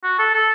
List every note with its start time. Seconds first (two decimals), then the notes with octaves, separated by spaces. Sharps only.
0.04 F#4
0.19 A4
0.34 A4